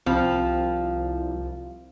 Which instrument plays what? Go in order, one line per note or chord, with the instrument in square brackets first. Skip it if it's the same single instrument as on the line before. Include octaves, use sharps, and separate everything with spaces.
[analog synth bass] C2 [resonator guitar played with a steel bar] F3 [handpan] C4